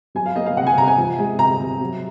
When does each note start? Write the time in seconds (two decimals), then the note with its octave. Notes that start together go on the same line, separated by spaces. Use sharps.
0.15 F#3 G#5
0.26 F5
0.36 A#3 D#5
0.46 F5
0.56 C3 F#5
0.67 G#5
0.78 C3 A#5
0.88 G#5
0.98 F3
1.18 G#3
1.39 C3 A#5
1.60 C3
1.81 F#3